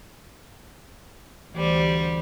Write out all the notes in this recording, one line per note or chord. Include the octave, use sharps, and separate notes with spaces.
D2 E3 G3 C5